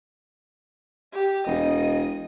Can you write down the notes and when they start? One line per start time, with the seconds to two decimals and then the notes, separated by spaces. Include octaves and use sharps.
1.14 G4
1.46 E1 D#5